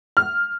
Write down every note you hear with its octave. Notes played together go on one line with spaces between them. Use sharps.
F6